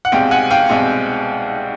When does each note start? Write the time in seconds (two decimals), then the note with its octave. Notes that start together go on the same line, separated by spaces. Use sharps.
0.05 F#5
0.12 C2 B2 G#3 C4 F5 G5
0.31 F#5 G#5
0.51 F5 G5
0.69 C2 B2 G#3 C4